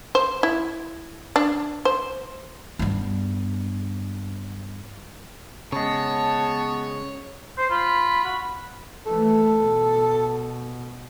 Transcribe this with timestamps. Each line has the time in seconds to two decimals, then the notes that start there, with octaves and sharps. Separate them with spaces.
0.15 C5
0.43 E4
1.36 D4
1.85 C5
2.79 G2 B3
5.73 C#3 G#3 B3 C#5 A5
7.57 C5 C7
7.70 F4 B5
8.24 F#4
9.06 E3 A3 A4
9.58 B2